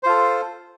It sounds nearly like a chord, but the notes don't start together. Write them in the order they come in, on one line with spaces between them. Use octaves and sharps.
C5 F4 A4